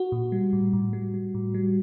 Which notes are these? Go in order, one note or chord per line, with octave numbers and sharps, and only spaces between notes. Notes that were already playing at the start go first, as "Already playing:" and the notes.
Already playing: F#4
A#2
G3
A2
A2
G3
G3
A2
G3